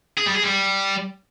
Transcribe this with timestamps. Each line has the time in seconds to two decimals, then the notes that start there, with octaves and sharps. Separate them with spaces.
0.17 G#4
0.26 G3
0.34 G#4
0.43 G3